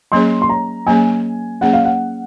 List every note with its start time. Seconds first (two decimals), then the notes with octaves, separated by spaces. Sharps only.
0.12 F#3 A#3 C#4 G#4 C#5 C6
0.42 C6
0.49 A#5
0.87 F#3 A#3 C#4 G#4 C#5 G#5
1.61 F#3 A#3 C#4 G#4 C#5 F#5
1.73 F5
1.85 F#5